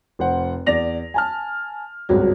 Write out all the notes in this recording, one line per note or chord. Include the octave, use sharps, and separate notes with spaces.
F1 C5 F#5
E2 D5 A#6 F7
G#5 A5 F6
G#1 C#2 G2 F#3